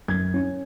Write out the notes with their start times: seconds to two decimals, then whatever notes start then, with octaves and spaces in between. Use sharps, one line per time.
0.08 F#2 G#6
0.34 C#4